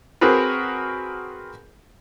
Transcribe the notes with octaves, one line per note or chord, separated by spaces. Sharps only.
C4 F#4 G#4 A#4 B4